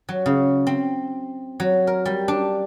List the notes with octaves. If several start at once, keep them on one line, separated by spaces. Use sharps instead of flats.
F#3
C#3
C4
F#3
A#4
G3
D4